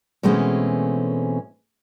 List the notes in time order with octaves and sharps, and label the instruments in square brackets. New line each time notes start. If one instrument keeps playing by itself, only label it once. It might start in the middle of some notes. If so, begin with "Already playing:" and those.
[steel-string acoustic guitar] B2 E3 G#3 A3 C4 C#4